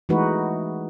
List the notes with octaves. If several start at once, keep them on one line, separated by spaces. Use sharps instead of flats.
E3 G#3 A3 D#4 F#4 B4